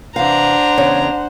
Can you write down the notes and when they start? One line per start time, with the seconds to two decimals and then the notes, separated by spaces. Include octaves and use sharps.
0.16 C3 E3 D4 C5 F5 F#5 A#5
0.78 E2 C#3 C#5